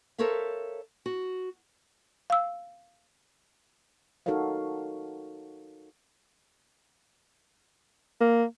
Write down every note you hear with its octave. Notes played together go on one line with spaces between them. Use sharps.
A4 A#4 C5 C#5 E5 F5
F#4
F5 E6
D#4 F#4 A4 A#4 C#5 F5
A#3